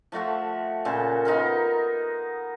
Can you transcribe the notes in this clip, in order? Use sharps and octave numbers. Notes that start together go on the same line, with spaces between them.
F3 A3 F#4 E5
A#2 C#3 A4 C5
B3 D#4 F4 A#4